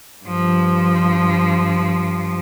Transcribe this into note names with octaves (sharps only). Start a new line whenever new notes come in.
G2 F3